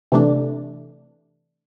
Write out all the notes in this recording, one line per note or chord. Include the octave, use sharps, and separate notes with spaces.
C3 E3 A3 D4